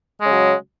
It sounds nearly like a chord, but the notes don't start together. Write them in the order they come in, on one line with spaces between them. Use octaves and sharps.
G#3 C#3 F#3